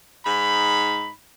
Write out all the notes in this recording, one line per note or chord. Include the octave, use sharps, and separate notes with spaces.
G#2 D#4 B5